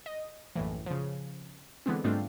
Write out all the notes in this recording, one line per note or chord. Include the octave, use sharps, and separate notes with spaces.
D#5
A#1 F#2 A2 E3
C#3 F3
D3 E3 G#3 B3 C4
G#2 G3 A3 C4 D4 F4